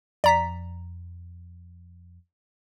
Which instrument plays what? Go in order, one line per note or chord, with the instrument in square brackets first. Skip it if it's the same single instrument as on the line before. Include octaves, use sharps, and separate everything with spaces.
[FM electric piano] F2 [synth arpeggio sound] D5 A#5 B6